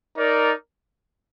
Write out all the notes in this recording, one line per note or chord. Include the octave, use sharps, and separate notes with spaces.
D#4 A#4 D5